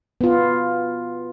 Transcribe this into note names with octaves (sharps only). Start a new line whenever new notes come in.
B3 F4